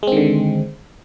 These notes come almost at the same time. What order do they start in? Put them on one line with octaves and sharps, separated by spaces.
G#3 C4 D#3 D3